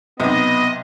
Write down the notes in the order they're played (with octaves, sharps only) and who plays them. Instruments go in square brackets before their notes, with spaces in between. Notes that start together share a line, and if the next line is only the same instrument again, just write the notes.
[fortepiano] B1 C3 D#6 [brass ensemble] B3 [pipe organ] D#5